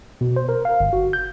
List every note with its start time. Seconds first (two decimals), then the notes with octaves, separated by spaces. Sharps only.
0.21 B2
0.36 C5
0.49 A#4
0.65 F5
0.80 G1
0.93 F#4
1.13 G6